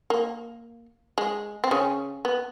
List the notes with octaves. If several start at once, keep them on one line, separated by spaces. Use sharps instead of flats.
A#3
G#3
C4
C#3 C#4
B3